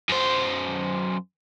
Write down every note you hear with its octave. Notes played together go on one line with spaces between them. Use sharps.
F#2 C5